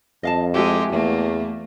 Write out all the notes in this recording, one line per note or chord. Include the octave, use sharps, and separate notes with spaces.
F2 D#5 F5 A5
G#3 E4 F#4 G4 A4
E2 A3 A#3